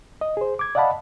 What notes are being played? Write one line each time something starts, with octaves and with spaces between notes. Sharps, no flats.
D#5
G#4 C5
D6 G#6
D5 D#5 F5 F#5 A5 B5